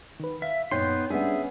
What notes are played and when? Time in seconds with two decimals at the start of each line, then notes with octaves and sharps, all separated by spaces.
0.20 D#3 B4
0.42 E5 F5
0.71 F#2 A#2 B3 D#4 C#5 G5 C6
1.10 G3 B3 C#4 D4 G#4 E5